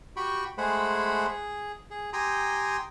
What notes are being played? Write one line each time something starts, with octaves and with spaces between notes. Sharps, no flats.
F#4 G4 G5 B5 C#6
G#3 A3 G#4 C5 F#5 B5
G#4
G#4
G4 G5 G#5 A#5 C6 D#6